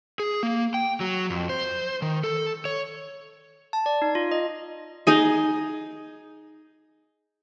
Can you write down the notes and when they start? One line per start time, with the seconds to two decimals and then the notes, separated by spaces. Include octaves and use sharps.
0.20 G#4
0.43 A#3
0.74 G5
1.00 F#3
1.30 F2
1.49 C5
2.02 D#3
2.24 A4
2.65 C#5
3.73 A5
3.86 D5
4.02 D#4
4.15 F4
4.31 D#5
5.07 D#4 G#4 D#5